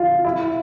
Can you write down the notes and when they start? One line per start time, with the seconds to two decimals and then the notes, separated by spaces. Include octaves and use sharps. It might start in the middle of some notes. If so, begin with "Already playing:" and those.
Already playing: F4
0.25 E4